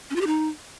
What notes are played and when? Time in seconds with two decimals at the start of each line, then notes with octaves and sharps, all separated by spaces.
0.10 C#4
0.16 F4
0.21 G4
0.27 D#4